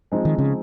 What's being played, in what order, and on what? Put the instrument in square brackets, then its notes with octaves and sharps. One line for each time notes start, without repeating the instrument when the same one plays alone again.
[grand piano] F3 G#3 C4 D#4
[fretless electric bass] D#3
C#3